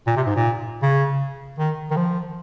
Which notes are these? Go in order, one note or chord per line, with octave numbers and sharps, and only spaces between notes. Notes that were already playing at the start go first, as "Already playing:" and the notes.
A#2
C3
G#2
A#2
C#3
D#3
D#3
F3